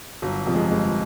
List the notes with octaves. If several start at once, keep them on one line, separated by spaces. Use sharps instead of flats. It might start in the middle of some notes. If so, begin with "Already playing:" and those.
G1 F#3
F2 C3 F3
G#3
G1 G#3